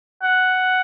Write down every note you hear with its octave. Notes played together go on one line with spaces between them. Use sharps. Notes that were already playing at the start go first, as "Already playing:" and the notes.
F#5